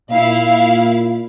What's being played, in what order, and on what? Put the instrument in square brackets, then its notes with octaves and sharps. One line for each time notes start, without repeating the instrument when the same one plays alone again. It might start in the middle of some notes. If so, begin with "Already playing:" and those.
[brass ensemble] A#2 [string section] E4 F5